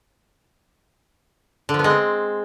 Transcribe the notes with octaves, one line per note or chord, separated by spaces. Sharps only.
D3
F3
B3
G#3
C4